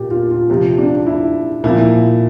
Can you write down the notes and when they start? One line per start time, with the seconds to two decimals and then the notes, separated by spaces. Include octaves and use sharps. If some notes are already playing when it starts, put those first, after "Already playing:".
Already playing: A#2 G4
0.11 F4
0.31 F4
0.50 C3 F3
0.78 D4
1.07 E4
1.64 A#2 F3 E4